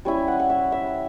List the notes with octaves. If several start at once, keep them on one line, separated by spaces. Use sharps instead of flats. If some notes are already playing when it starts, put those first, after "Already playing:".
G3 C#4 E4
F#5
F#5
E5
E5